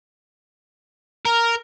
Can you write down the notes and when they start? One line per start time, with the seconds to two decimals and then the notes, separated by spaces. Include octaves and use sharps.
1.25 A#4